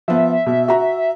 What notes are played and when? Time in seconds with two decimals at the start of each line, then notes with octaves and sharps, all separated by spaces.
0.08 F3 B3 E5
0.46 B2
0.68 F#4 A#5